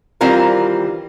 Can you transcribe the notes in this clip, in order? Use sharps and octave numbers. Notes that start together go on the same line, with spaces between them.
D#3 E3 G3 C4 F4 A#4